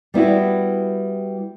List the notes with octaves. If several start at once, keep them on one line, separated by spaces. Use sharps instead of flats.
G3 B3 E4 F#4